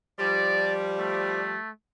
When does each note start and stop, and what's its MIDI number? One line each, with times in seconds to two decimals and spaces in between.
0.20 1.57 53
0.20 1.57 55
0.20 0.72 74
0.99 1.70 57